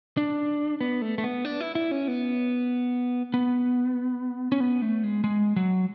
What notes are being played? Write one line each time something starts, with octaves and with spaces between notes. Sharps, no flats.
D4
B3
A3
A3
B3
D4
E4
E4
C#4
B3
B3
C#4
B3
A3
G#3
G#3
F#3